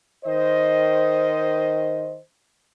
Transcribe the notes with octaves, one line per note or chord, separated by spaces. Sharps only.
D#3 C5 D#5